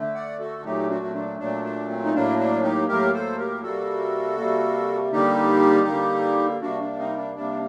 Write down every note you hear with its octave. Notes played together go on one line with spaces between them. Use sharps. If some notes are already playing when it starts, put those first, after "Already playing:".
Already playing: D3 A3
D5 F#5
F#4 A4
F#4
A#2 F#3 A3 D#4 G4
D4 F#4
C4
D4
A#2 F#3 A3 D4
D4
C4
D#4
A2 F#3 A#3 D4
D4
D#4 G4
A2 F#3 A#3 G4 A#4
A4 C5
G4 A#4
C3 G3 A#3 F#4 A4
C3 G3 A#3
D3 G3 A#3 D#4 G4
D3 G3 A#3
C3 G3 A#3 D4 F#4
D4
C4 D#4
D4
C3 G3 A#3 D4